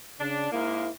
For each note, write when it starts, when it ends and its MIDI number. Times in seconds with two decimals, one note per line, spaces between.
0.20 0.51 49
0.20 0.49 62
0.52 0.87 44
0.52 0.87 58
0.52 0.90 64